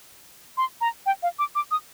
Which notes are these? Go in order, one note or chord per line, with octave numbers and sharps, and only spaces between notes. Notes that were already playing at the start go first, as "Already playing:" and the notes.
C6
A#5
G5
F5
D6
D6
D#6